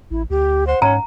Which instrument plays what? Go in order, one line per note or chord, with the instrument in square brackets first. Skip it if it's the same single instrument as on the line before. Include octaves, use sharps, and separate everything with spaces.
[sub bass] A1 [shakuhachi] E4
[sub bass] D2 [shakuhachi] G4
[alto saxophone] C5 [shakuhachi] F#5
[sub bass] G#2 [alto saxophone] C#4 [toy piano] A#5